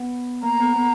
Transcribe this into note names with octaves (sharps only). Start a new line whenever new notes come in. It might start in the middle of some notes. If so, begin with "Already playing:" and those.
Already playing: B3
A#3 A#5
B3
B3